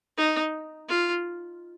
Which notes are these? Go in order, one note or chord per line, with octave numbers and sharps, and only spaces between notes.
D#4
F4